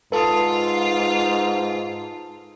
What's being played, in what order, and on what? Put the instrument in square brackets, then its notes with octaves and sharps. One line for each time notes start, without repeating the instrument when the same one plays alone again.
[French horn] G#2 [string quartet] F4 [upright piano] A4 A5 D#6 [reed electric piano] B4